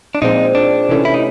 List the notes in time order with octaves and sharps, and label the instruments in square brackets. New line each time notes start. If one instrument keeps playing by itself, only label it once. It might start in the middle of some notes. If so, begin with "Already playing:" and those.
[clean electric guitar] D4
[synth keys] A#2 F3 G#3 C4 [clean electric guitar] D#4
[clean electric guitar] D4
[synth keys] C3 E3 A3 C#4
[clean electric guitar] E4
D#4